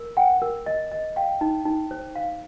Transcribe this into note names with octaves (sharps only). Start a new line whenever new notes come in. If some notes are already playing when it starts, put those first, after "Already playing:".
Already playing: A#4
F#5 G5
A#4
D#5
D#5
F5 G5
D#4
D#4
C5
F5